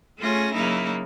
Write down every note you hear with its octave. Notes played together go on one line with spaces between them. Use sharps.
A3 C#4 F4 G#4 A#6
C#3 F#3 A#3 D#4 E4